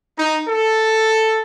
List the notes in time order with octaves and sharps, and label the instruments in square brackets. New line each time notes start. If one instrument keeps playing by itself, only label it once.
[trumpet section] D#4
A4